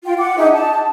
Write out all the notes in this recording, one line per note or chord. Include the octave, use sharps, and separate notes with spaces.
F4 G5
F#5 D6
D4 D#4 G#4 E5
A5